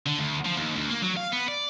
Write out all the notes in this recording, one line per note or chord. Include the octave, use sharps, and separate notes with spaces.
D3
D2
F3
D#2
D2
A#3
F#3
F5
B3
D5